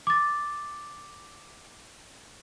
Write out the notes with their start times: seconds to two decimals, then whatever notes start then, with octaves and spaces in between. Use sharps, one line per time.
0.07 D6 A6